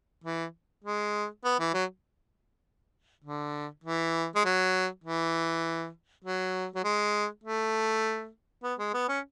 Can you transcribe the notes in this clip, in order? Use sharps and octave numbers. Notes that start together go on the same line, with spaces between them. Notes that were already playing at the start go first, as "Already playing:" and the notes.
E3
G#3
B3
E3
F#3
D3
E3
G#3
F#3
E3
F#3
F#3
G#3
A3
B3
G#3
B3
C#4